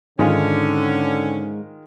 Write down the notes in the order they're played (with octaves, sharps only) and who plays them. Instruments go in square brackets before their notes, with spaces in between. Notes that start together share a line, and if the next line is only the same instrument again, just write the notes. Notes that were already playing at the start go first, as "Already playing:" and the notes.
[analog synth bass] G#2 [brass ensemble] D3 [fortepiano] D#3 G#3 F4 [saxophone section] C#4